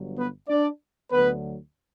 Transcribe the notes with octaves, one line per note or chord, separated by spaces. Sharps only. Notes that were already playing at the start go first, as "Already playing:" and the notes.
Already playing: G1 G2 F#3
B3 B4
D4 D5
D2 D3 F#3 B3 B4